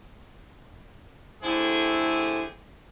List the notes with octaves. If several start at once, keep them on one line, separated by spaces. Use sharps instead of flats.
D3 A3 C4 E4 G4 G#4